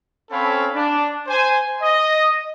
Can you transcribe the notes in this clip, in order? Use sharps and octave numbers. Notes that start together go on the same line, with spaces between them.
C4 C#4 A4 C#5 F5 B5
D4
C5 G#5
D#5